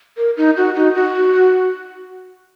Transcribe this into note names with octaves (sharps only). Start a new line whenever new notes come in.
A#4
D#4
F#4
D#4
F#4